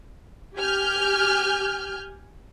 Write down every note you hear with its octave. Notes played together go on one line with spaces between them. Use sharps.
G4 G#5 F6 G6